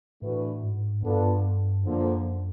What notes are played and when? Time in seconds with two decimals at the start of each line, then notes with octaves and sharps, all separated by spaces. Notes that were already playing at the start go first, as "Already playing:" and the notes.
0.21 A2 E3 A3 D4 F#4 B4
0.63 G#2
1.03 G2 B3 D4 F4 A4
1.84 F#2 D3 F3 A#3